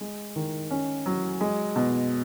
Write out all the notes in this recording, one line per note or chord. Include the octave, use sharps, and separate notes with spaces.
G#3
D#3
C#4
F#3
G#3
B2